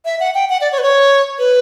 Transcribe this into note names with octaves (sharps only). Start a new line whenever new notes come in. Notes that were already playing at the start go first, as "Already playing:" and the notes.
E5
F#5
G5
F#5
D5
C#5
B4
C#5
B4